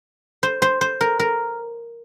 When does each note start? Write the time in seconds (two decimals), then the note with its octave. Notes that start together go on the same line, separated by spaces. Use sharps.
0.43 C5
0.62 C5
0.81 C5
1.01 A#4
1.20 A#4